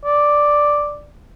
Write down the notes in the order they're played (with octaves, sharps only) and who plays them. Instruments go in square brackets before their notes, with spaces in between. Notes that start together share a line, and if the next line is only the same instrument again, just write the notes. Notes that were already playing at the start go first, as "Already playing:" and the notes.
[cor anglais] D5